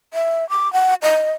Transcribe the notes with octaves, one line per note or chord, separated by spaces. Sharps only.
E5
D6
F#5
D#5